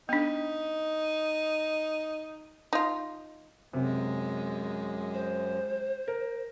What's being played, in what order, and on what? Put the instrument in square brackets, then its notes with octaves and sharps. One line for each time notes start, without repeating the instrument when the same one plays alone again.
[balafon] B3 D4 [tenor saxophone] D#4
[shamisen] D#4 F4
[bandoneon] F#2 [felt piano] C3 [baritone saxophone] G#3
[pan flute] C5
[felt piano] A#4